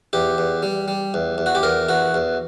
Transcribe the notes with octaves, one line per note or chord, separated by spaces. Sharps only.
E2 G4
E2
G3
G3
E2
E2
F#4
G4
E2 A#4
E2 F#4
E2